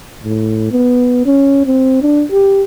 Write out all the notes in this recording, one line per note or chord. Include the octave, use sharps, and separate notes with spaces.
A2
B3
C#4
C4
D4
G4